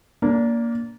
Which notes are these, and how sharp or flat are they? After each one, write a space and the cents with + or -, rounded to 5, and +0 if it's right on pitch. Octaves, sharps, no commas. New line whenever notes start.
A#3 +5 D4 -25